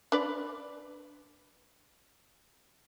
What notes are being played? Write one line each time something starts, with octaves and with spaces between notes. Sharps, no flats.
D4 B4 D5